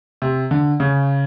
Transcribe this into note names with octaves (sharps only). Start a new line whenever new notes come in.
C3
D3
C#3